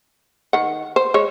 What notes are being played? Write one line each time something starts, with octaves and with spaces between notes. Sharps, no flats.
D#3 F#5
C5
G#3 C#5